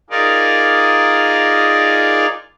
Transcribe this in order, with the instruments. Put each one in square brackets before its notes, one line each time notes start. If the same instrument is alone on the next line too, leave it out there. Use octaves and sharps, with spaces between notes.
[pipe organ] D#4 F4 G#4 A#4 D5